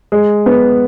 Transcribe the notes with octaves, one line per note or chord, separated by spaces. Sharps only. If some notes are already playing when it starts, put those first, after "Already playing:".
G#3
B3